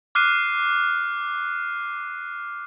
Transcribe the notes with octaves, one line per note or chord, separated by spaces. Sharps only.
D6 F6 F#6 C7 D#7